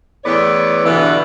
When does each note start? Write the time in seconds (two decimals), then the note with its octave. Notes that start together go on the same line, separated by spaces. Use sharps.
0.24 E2 A2 B3 C#5 D5
0.84 G2 B2 D3 E3